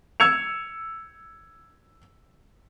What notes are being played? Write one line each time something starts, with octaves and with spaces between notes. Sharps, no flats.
E6 G#6 C#7 F7